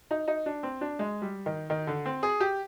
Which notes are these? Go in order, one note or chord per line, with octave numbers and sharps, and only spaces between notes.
D#4
D#4
D4
C4
D4
G#3
G3
D#3
D#3
D3
C4
G#4
G4